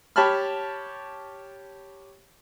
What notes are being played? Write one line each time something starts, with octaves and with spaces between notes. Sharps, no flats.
G4 C#5 A5 B5 F6